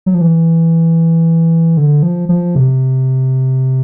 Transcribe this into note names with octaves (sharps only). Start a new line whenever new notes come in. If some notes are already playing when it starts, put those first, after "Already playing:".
F#3
F3
E3
D3
F3
F3
C3